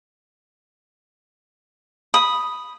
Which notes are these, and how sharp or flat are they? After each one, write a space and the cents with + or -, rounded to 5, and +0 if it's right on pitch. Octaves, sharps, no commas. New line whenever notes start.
B5 -5 D#6 +0